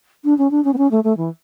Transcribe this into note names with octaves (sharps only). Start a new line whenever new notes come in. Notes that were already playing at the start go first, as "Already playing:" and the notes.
D4
C#4
D4
C#4
B3
C#4
A3
A3
E3